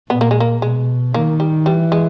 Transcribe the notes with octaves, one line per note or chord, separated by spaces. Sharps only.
A#2 B3
A#3
G#3
A#3
B2 G#3
D#3 A#3
G3
E3 G3
G#3